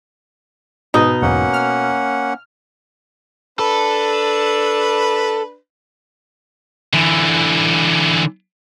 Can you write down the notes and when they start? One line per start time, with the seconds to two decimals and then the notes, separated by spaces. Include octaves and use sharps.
0.94 G#2 B2 D#4 D#6
1.22 B1 E2 G#2 A#3 C#4 F#5
1.53 F6
3.59 D4 A4 B4
6.93 D3 E3